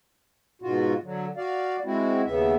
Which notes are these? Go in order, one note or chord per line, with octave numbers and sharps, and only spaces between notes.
G#2 B2 F4 F#4
D3 F#3
F#4 D5 F5
G#3 C4 E4 F#4
D#2 C#3 B3 E5